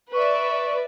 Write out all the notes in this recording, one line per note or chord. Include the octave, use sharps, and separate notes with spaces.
B4 D5 E5 C#6